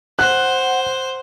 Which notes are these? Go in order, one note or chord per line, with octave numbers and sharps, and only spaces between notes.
C5 F#5 F#6